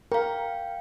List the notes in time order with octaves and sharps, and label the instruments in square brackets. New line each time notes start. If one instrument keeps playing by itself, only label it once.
[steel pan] A#4 [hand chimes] F5 G5